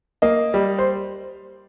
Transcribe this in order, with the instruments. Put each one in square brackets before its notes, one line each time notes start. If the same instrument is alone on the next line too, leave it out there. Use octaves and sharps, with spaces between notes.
[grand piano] A#3 D#5
G3
C5